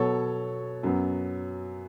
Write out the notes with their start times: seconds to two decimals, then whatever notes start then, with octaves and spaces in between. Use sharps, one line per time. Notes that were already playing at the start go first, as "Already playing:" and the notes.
Already playing: B2 F#3 B3 A4 C#5
0.83 F#2 F#3 B3